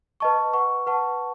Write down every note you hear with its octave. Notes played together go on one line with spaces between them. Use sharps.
B4 D#5 A5 C#6
B4 F#5 C#6
B4 F#5 A5 C#6